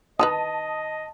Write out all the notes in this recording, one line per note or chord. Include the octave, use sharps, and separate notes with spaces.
D#3 D#4 B4 D#5 A5 D#6